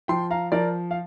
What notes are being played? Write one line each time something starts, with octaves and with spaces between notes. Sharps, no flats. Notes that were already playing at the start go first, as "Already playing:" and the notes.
F3 G5 C6
F5 A#5
F3 A#4 D5
F5